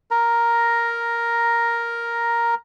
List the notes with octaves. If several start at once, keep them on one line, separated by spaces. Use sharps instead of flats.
A#4 A#5